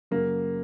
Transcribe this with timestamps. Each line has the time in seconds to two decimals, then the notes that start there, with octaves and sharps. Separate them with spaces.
0.11 F#2 C#3 F#3 A#3